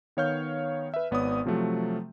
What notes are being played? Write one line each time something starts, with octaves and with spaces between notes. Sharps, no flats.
D#3 B3 C#5 F5 F6 G6
B4 E5
G#1 B3 C#5 D5 D#6
C3 F3 F#3 A3